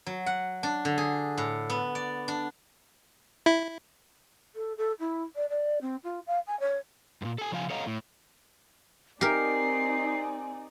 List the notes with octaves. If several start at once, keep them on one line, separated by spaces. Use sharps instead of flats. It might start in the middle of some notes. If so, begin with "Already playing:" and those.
F#3
F#5
D4
D3
G#4
A2
B3
D5
D4
E4
A4
A4
E4
D5
D5
C4
F4
F5
G#5
C#5
F#2 A#2
A4 G#5
C#3 F3 F5 G#5
A4 C#5 D#5 F5 F#5 A#5
A2
C4 D#4 G4 A#4 D5 G#5 C7